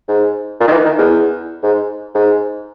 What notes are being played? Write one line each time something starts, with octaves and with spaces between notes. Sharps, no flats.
G#2
A#2
D#3
E3
D#3
E2
G#2
G#2